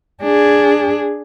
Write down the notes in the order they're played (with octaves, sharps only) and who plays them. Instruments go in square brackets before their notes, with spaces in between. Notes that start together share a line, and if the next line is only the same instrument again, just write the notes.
[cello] D4 G#4